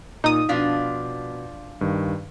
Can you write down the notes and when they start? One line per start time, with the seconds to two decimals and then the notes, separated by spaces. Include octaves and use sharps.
0.24 A#2 D#4 D#6
0.49 B2 F3 D4 F4 B6
1.81 G2 D#3